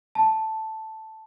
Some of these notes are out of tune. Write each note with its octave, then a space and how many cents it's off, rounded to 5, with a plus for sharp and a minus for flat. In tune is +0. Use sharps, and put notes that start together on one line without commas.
A5 +0